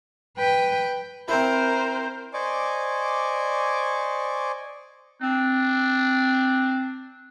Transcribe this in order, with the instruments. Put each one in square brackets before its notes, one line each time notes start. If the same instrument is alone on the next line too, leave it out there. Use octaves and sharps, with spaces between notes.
[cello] B4 G5
[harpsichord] C4 E4 [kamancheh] A#4 [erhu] C5
[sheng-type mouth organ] C5 D5 D#5 G#5 C#6 D6
[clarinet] C4 [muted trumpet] D4